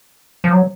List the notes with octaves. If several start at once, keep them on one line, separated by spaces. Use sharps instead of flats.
F3
F#3